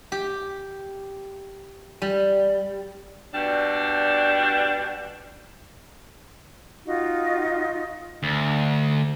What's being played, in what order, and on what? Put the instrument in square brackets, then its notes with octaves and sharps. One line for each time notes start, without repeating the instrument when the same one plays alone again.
[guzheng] G4
G3
[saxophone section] B2 G3 D4
[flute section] D#4 F4 F#4 F5
[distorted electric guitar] D2